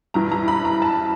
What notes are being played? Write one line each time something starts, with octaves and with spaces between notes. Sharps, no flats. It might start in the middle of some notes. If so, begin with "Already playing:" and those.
G2 E3 A#5
A#5
B5
A#5
A5